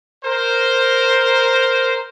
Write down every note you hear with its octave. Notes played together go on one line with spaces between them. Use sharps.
A#4 C5